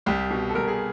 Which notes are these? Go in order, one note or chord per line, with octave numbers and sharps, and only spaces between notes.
C2 G4
B2
A4
C2 A#4
G#4